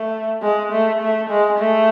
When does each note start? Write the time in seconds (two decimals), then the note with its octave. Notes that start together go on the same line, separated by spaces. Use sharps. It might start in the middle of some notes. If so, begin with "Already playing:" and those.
Already playing: A3
0.42 G#3
0.72 A3
1.01 A3
1.30 G#3
1.59 A3